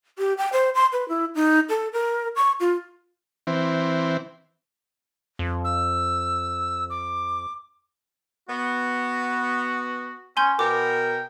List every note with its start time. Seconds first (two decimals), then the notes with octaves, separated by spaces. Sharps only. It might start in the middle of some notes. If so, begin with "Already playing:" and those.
0.19 G4
0.38 G5
0.53 C5
0.75 C6
0.93 B4
1.09 E4
1.35 D#4
1.69 A4
1.93 A#4
2.36 C#6
2.60 F4
3.47 E3 C4
5.39 F2
5.64 E6
6.90 D6
8.49 B3 F#4
10.37 C#4 G#5 C6 G6
10.59 B2 B3 A#4 G5 D6